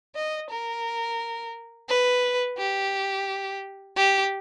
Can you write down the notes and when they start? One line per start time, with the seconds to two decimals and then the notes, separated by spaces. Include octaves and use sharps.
0.15 D#5
0.50 A#4
1.88 B4
2.58 G4
3.96 G4